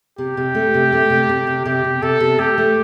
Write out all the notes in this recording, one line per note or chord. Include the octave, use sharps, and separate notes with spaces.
C3 G4
C3
A3
C3
A3
C3
C3
C3
C3 G4
C3
C3 A4
C3
A3 G4
A3